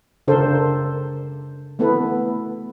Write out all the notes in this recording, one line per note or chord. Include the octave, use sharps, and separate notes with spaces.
C#3 D4 A4 A#4 C5
A3 B3 E4 A4 B4